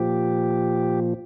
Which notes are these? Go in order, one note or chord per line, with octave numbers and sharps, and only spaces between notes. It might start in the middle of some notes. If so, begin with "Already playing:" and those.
Already playing: A#2 F3 G4